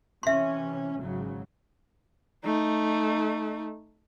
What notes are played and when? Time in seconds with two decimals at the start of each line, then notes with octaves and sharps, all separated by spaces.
0.23 C3 E3 C#4 E5 C6
0.97 G#1 C#3 F#3
2.45 A3 D#4